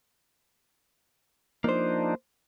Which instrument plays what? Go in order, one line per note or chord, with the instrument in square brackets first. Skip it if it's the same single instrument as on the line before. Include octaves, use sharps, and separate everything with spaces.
[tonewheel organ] F3 D4 D#4 [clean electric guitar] A#3 C5